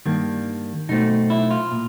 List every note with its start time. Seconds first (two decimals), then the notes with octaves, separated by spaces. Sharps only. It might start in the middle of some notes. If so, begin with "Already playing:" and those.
0.06 G2 D#3 G3 A#3
0.89 B2 F#3 A3 C4 D#4
1.30 E4
1.51 F4
1.72 A#2